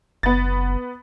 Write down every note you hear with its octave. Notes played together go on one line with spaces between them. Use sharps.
F#1 B3 A6